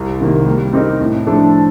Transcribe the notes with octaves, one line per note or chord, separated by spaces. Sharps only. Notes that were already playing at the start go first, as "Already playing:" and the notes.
Already playing: C2
C3 D#3 A#3
G3
C4 D#4 G4 A#4
A2
F3 A3 D4 A4